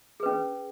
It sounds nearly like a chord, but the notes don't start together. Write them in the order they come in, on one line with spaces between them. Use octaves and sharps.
G#4 B4 C#4